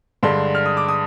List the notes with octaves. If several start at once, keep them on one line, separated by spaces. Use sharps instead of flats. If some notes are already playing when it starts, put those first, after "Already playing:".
G2 D3 G#3 D4 C6
F6
D#6
D6
D#6